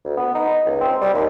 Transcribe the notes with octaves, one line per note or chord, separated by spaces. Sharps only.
D2
B3
D#4
C#2
C4
G3
D#2